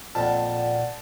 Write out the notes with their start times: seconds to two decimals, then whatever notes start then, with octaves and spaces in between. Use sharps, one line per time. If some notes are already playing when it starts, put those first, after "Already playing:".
0.15 F2 A#2 D5 F#5 A5